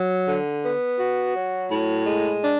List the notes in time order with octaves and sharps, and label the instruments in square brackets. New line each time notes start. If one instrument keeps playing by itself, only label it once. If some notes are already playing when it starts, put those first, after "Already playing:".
Already playing: [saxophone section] F#3
D3
B3
F#4
F#3
A2
G#3
D4